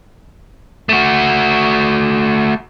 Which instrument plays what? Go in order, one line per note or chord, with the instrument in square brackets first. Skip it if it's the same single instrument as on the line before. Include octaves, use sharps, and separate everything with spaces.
[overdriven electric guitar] A3 F#4